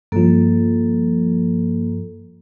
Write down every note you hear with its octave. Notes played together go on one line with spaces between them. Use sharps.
G2 F3 A#3 A4